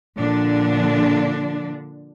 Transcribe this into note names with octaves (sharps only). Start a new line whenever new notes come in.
A#2 D3 F3 D4